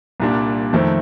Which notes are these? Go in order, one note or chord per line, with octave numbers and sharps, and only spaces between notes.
C2 A#2 G3 D4
F2 D#3 A3 C4